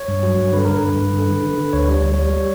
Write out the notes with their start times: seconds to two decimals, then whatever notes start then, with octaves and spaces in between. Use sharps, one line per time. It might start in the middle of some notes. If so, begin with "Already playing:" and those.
Already playing: C#5
0.08 G2
0.23 F#3
0.38 G2
0.53 D3 B4
0.65 D3 A#4
0.77 B4
0.83 G2
0.98 G2
1.14 D3
1.29 D3
1.43 D3
1.58 D3
1.73 D2 C#5
1.88 G3
1.94 C#5
2.03 D2
2.14 C#5
2.19 G3
2.34 G3